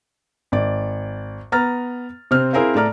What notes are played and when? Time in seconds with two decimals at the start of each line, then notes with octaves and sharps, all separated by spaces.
0.52 G#1 D5
1.52 B3 A#5 F6 A6
2.31 C3 C4 F6
2.53 C4 E4 G#4 A#4 C5 F5
2.75 A2 A3 D5 A#5 F6